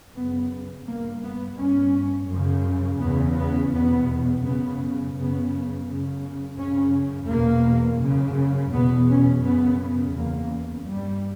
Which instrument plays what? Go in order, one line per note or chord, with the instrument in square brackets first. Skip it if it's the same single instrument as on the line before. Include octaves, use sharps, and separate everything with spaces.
[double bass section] F#2 C#3 B3
G2 A#3
B3
G2 C#4
F#2 C#3
E2 C#3 B3
B3
E2 B2 B3
F#2 C#3 B3
F#2 C#3 B3
F#2 C#3
F#2 C#3 C#4
E2 B2 A#3
F#2 C#3
E2 B2 B3
C#4
F#2 C#3 B3
E2 C#3 A#3
G2 G3